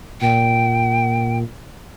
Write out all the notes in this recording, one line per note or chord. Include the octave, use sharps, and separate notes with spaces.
A#2 G5